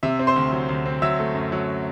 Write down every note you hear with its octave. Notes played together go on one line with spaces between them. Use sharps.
C3 E5
C4
C5 C6
D2
F#3
D2
C4
F#3 E5 E6
A3
F#2
F#3